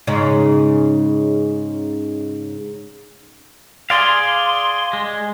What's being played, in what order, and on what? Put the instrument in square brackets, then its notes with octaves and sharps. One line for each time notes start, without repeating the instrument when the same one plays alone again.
[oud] G#2 C#3 D#4
[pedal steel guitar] G#4 D5 F5 [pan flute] C6
[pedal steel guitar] G#3